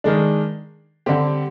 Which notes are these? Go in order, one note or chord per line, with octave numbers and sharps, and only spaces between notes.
D#3 G#3 D4
D3 G3 C4 G4